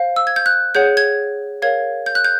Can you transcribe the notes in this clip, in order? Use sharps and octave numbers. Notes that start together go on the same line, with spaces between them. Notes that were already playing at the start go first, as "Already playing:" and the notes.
Already playing: C5 F5
E6
G#6
G6
F#6
G#4 C#5 F#5 G6
G#6
A#4 C#5 F5 G#6
G6
F#6
G6